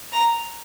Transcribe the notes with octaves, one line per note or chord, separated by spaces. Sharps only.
A#5